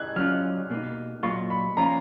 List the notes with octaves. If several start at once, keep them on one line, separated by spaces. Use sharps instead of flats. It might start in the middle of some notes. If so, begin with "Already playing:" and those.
Already playing: F#6 G#6
F#3 C#4 F4 F6
B2 A#3 D#4
A#2 F#3 A#3 F4 C#6
B5
F3 A#3 C#4 F4 A#5